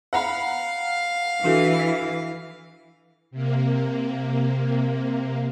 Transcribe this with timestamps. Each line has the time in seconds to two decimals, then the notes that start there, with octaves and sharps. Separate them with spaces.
0.13 F5 F#5 A#5 B5
1.44 E3 D4 F#4 A4
3.31 C3 A#3